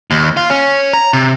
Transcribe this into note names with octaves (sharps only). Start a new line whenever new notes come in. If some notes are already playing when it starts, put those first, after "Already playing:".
D#2
F4
C#4
A#5
C3